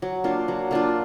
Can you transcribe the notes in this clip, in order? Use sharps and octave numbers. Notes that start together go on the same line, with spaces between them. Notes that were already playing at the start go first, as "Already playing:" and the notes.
F#3
A#3 D4 F4
F#3
A#3 D4 F4